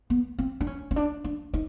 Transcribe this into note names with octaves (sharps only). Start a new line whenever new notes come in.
B3
C4
D4
C#4
C#4
D4
D4
D#4